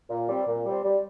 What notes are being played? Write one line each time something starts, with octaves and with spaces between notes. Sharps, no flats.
A#2
G3 C4
A#2
G3 C4
G3